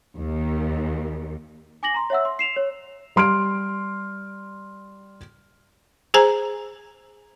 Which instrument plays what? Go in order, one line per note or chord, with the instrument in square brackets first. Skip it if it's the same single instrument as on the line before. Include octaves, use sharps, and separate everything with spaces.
[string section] D#2
[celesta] G#5 D6 A#6 F#7
A#5 C6
C#5 E5 F#5 E6
C6
C7 E7 F7
C#5
[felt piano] G3 C6 F6 D7
[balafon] G#4 C5 G#5 A#5